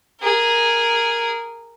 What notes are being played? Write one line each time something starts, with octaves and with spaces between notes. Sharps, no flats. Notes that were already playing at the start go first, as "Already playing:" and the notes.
G#4 A#4